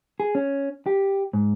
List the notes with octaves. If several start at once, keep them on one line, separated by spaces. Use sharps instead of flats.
G#4
C#4
G4
G#2